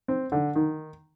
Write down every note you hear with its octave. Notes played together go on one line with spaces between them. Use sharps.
C4
D3
D#3